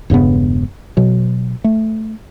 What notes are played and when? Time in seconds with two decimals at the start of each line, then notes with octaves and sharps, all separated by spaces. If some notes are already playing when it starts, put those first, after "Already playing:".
0.10 E1 G2 C#3 B3
0.97 B2 F#3
1.64 A3